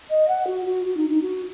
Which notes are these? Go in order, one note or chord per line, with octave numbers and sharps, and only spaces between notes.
D#5
F#5
F#4
F#4
F#4
D#4
D#4
F#4